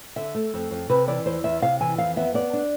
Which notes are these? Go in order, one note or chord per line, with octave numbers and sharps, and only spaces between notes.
D3 E5
A3
F2
F2
C3 B4
E3 D5
E2 C5
E2 E5
C3 F5
E3 G#5
F2 F5
B3 E5
B3 D5
D4